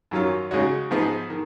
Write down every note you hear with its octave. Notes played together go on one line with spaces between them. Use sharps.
F#2 D#3 F#3 C#4 F4
C#3 G#3 D#4 F#4 C#5
G#2 F3 B3 D#4 G#4
D#3